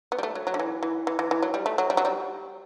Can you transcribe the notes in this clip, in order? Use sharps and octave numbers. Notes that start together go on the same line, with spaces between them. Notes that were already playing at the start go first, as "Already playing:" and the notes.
B3
G3
A3
F#3
F#3
D3
E3
E3
E3
E3
E3
F#3
G3
A3
F#3
G3
F#3
G3